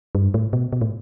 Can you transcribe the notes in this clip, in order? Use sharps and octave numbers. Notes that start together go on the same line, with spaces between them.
G2
A2
B2
B2
A2